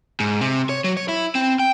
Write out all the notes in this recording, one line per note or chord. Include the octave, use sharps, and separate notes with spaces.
G#2
C3
C#5
F#3
C#5
E4
C4
G5